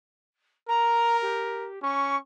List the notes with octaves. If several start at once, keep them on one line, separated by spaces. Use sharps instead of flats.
A#4 A#5
G4
C#4 C#6